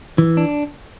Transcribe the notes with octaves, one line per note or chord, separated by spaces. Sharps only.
E3
D4